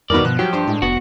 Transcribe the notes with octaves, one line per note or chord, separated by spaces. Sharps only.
E2 G2 B2 D#3 A#4 B4 D5
B2 F3 F#6
F#3 G4
G2 C5
A2 G#3
F1 B3 F#4